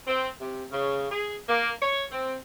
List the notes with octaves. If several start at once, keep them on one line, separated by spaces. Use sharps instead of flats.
C4
C3
C#3
G#4
A#3
C#5
C4